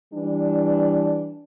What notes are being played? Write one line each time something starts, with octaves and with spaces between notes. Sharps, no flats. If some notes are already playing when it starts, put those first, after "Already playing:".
E3 G3 D4